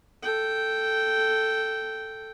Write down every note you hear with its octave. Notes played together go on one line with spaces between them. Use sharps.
A4 G5